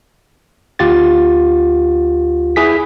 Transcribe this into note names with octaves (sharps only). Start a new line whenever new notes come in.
D2 F4 G4 A6
E4 G#4 B6